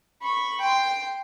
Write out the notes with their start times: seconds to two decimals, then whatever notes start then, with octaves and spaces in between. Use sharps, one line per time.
0.22 B5 C#6
0.61 G5 C6